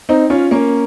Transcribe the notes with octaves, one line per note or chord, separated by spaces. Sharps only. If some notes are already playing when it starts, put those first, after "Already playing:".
C4 D#4
C#4 F4
A#3 C#4